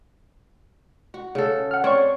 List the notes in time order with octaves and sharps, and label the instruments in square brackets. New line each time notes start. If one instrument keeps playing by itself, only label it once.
[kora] F#4
C#3 A4
[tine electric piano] F#5 F6
[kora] C4 [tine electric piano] C#5 D5 C#6